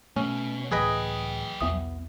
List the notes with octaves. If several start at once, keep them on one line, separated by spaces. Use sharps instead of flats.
B2 A3 C#4
C#2 A2 E3 F#3 G#4 B4 D#5 G5
B1 E2 B3 E5 D#6